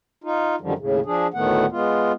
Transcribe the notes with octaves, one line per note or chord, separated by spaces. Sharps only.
D#4 F4
F#2 D3 D#3 F3 G3
D#2 A2 C#3
F3 D4 G#4
D2 A2 D#3 A3 B3 F#5
G#3 B3 F4